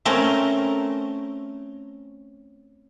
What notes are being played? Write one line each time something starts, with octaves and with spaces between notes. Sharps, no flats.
A3 C4 C#4 A#4